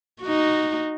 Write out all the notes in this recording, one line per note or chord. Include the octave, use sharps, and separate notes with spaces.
D#4 F#4